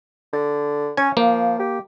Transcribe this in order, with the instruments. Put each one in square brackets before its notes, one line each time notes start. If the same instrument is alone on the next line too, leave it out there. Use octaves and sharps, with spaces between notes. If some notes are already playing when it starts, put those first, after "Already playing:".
[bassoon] D3
[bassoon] C#4 [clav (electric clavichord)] G#5
[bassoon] F3 [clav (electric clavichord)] A#3
[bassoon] G4